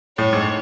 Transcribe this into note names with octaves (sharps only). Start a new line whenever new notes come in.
A2 C#5
G#2